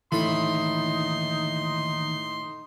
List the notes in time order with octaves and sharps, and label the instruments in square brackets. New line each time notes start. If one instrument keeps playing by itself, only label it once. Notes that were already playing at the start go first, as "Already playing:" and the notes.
[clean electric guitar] D#2 D3 E3 [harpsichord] A2 B5 [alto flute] D#4 [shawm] C6